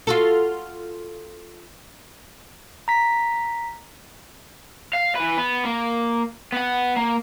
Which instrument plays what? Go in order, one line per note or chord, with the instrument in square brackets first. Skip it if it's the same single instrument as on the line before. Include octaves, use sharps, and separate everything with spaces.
[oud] F4 F#4 A4
[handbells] A#5 B6
[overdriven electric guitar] F5
E3 B4
B3 B4
A#3
B3 F#5
A#3